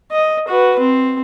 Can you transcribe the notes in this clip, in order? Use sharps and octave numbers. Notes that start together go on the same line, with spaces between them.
D#5
F#4 B4
C4